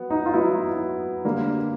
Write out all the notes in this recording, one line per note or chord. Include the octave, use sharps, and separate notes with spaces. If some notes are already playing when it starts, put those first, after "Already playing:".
Already playing: F#3 B3
D#4
F4
F#3 B3 D#4 E4
D3 G3 A#3